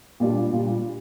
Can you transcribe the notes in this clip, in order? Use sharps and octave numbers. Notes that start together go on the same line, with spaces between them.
A#2 G3 D4 F4
A#2 G3 D4 F4